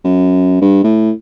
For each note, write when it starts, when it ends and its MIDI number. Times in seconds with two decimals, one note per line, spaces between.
0.04 0.57 42
0.61 0.82 43
0.84 1.11 45